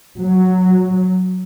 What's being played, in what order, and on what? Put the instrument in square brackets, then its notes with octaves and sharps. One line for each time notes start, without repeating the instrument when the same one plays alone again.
[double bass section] F#3